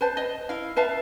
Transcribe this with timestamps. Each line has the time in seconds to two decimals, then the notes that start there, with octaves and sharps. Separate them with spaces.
0.01 B4 C5 A5
0.17 D#5
0.49 E4 F5
0.76 B4 E5 F5 A5